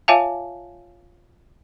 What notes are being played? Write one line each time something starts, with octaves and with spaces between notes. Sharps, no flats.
F4 C#5 E5 F5 G#5 A5